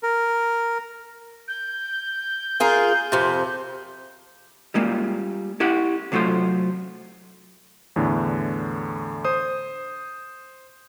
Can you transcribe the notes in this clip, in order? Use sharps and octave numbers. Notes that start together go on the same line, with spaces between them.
A#4
G6
F4 G#4 A#4
F2 C3
G3 G#3 A#3 F4
E4 G4 F#5
C3 F#3 A3 F4 C5
E2 A2 D3
C5 D#6